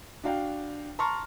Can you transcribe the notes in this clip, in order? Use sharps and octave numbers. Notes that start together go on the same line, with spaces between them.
D4 F#4 F5 G5
A5 A#5 C6 C#6 F6